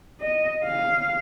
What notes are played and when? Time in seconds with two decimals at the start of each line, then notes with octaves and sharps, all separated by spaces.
0.21 D#5
0.64 F5